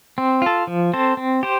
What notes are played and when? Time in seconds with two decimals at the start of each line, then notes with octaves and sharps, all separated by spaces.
0.18 C4
0.42 F4 A4
0.67 F3
0.94 C4 A4 C5
1.17 C4
1.43 G4 C5